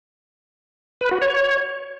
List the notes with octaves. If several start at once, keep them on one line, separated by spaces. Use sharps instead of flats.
B4
F#4
C#5